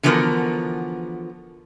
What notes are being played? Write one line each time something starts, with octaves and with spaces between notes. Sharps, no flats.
D3 E3 F3 B3 F#4 A#4